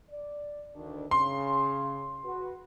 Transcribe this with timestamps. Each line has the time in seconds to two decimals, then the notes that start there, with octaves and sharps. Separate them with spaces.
0.10 D5
0.75 D2 D#3 D4
1.11 C#3 C6
2.25 F#4 B4